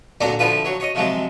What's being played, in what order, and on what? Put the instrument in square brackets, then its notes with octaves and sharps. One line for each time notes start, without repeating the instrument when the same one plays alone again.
[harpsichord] A#2 D3 F#3 D4 D5 A#5
D3 F3 E4 F4 B4
F#3 C#5
C#5 D#5
C3 F3 F#3 G#3